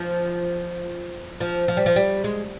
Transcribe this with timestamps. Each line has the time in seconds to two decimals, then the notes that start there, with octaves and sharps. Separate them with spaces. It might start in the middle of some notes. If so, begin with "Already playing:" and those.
Already playing: F3
1.40 F3
1.68 F3
1.77 G3
1.86 F3
1.96 G3
2.24 G#3